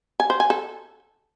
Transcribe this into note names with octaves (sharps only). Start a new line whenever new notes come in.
G#5
C5
G#5
A4